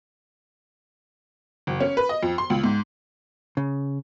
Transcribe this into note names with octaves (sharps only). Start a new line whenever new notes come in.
F#1
C#4
B4
D#5
F2
C6
C#2
G#2
C#3